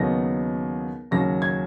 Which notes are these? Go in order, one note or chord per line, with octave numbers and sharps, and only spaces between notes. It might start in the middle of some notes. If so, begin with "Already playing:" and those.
Already playing: D#2 C#3 F#3 B3 D#4 A#6
D#2 C#3 F#3 C#4 A#6
G#6